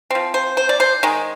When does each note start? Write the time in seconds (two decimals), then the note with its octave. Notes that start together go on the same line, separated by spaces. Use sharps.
0.10 F3 C4
0.34 C5
0.57 C5
0.69 D5
0.80 C5
1.03 D#3 G#3